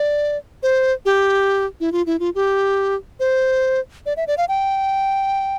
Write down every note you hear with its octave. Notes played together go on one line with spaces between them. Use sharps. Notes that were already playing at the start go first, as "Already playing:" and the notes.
Already playing: D5
C5
G4
E4
F4
E4
F4
G4
C5
D5
E5
D5
F5
G5